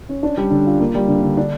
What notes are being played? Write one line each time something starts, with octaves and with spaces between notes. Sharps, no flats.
C#4
D4
G3
D3
F4
A#3
G3
D3
D3
D4